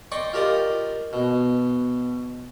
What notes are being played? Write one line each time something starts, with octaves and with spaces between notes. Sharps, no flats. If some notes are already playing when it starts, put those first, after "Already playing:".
D5 D#5 G5 C6 C#6
F4 G4 A#4 D5 D#5
B2